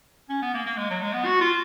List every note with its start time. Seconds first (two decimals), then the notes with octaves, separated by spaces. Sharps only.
0.29 C#4
0.42 B3
0.54 A#3
0.66 A#3
0.77 G#3
0.90 F#3
1.02 G#3
1.14 B3
1.25 F#4
1.41 F4